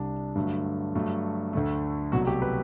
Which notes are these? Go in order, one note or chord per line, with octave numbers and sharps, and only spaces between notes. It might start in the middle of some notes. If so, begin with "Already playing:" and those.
Already playing: C2 C3 G3 D4
G2 D3 F#3 A3
G2 F#3 A3
D2 D3 A3
C2 B2 F#3 A3 F#4
G4
B4